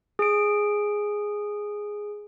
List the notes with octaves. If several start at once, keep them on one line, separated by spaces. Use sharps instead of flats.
G#4 D7